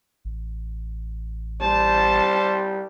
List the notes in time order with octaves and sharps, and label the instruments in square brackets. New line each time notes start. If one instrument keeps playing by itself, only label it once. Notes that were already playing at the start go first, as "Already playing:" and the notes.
[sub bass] A1
[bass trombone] G3 [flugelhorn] C5 [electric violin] A5